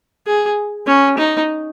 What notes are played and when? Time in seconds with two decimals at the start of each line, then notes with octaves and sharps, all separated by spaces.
0.27 G#4
0.87 C#4
1.18 D#4